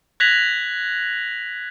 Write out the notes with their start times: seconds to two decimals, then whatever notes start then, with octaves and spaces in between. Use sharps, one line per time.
0.20 F#6 G#6 A#6 B6 F7 F#7